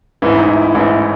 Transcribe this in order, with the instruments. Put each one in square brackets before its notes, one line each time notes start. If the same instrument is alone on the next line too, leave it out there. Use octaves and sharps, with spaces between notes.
[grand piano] A1 G#2 E3 [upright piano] E4
[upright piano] D#4
E4
E4
[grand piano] A1 G#2 E3 [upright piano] E4